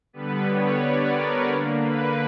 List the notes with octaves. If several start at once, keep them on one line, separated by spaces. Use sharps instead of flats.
D3 G3 B3 B4
C#5
D5
A#4
D3 A#3
B4